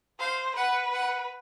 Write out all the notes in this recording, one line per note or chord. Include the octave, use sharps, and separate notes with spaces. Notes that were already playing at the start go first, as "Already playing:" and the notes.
C5 F5
B4 F#5
F#5